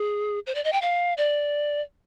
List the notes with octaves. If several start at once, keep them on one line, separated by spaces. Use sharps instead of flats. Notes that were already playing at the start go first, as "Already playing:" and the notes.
Already playing: G#4
C5
D5
D#5
G5
F5
D5